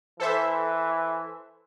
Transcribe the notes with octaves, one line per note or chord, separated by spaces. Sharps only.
E3 A4 C5 E5